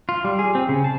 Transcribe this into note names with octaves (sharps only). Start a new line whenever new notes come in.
F4
G3
G#4
C4
C#3
A5